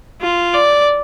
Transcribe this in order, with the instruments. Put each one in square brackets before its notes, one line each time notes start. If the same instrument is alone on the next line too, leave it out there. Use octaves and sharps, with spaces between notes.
[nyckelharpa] F4
D5